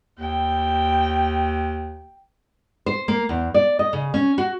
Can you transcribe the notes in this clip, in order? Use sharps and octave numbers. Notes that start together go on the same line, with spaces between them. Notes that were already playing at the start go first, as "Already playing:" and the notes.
D#2 G5
C5
A#3
E2
D5
D#5
C#3
C#4
F#4